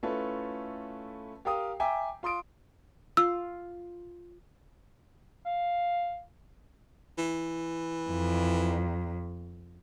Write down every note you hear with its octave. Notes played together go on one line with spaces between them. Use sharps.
A3 C#4 E4 F4 A4 B4
G4 A#4 F5 G5 D#6
E5 G5 G#5 A#5 D6
F4 C6 D#6 D7
F4 E6
F5
E3
F2